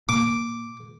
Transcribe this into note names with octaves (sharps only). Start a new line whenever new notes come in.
A#2 D6